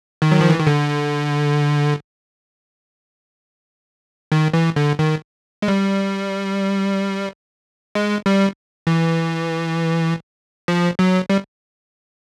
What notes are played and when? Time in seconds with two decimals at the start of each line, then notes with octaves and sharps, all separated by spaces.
0.22 D#3
0.32 F#3
0.41 F3
0.50 E3
0.59 D#3
0.67 D3
4.32 D#3
4.54 E3
4.76 D3
4.99 D#3
5.62 G#3
5.68 G3
7.95 G#3
8.26 G3
8.87 E3
10.68 F3
10.99 F#3
11.30 G3